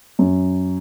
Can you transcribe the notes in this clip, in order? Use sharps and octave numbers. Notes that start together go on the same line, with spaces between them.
F#2